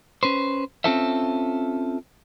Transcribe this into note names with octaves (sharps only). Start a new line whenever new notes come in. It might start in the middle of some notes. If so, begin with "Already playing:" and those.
C#4 B4 C5
C4 C#4 F4 A4 C5 E5